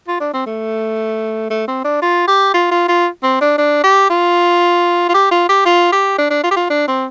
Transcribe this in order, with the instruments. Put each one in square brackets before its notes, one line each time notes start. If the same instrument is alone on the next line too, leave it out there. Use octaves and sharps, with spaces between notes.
[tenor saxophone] F4
D4
C4
A3
A3
C4
D4
F4
G4
F4
F4
F4
C4
D4
D4
G4
F4
F4
G4
F4
G4
F4
G4
D4
D4
F4
G4
F4
D4
C4